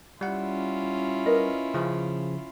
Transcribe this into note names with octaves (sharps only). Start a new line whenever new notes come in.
G3 C#4 E4 F4 F#5
A#4 B4 D#5
C#3 F3